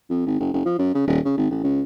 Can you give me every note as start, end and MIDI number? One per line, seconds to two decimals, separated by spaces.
0.10 0.22 41
0.26 0.39 32
0.40 0.49 30
0.54 0.64 30
0.65 0.74 53
0.79 0.91 42
0.95 1.06 49
1.08 1.19 27
1.25 1.36 49
1.37 1.47 32
1.51 1.59 33
1.64 1.83 37